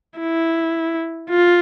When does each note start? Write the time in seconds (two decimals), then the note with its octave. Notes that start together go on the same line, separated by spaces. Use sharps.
0.19 E4
1.30 F4